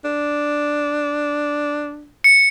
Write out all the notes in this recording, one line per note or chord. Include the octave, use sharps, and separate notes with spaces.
D4
C#7